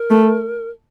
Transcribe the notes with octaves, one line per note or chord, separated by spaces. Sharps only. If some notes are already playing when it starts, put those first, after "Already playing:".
Already playing: A#4
A3